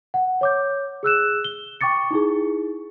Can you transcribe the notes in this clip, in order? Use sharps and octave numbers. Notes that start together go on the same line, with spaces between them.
F#5
C#5 D6 G6
G#4 E6 F#6 E7
G7
G5 C#6 D6 A6 C#7
D#4 E4 G#4